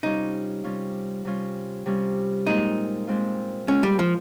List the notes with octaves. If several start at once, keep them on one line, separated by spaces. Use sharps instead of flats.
C3 G3 C#4 D#4 F4
C3 G3 C#4 F4
C3 G3 C#4 F4
C3 G3 C#4 F4
A#2 G#3 C4 D#4 F4
A#2 G#3 C4 F4
A#2 G#3 C4 C#4 F4
G3
F3